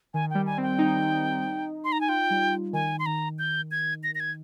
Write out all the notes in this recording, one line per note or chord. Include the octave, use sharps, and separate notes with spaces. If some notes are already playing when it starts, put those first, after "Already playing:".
D#3 G#5
G3 G5
G#5
C4 G5
D#4
C6
A#5
G#5
F4 G5
G3
D#3 G#5
C6
D#3 A#5
G6
G#6
A#6
A#6
G#6